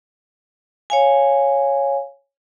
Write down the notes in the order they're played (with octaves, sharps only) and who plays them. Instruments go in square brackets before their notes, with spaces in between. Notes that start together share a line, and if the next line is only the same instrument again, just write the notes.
[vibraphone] C#5 F5 G#5